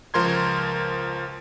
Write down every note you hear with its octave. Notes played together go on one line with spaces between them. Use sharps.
C#2 F3 A#4 C6 G#6